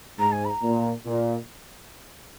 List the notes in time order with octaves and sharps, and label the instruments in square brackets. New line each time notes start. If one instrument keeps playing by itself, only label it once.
[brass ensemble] G#2 [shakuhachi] A#5
[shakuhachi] G#5
B5
A#5
[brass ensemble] A#2
A#2